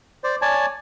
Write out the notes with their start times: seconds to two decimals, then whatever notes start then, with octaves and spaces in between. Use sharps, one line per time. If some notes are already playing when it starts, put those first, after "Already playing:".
0.24 C5 D5
0.42 C#5 D5 G#5 A5